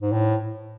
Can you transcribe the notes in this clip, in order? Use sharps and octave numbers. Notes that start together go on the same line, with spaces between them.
G#2
A2